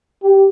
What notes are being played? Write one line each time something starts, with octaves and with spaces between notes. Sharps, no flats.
G4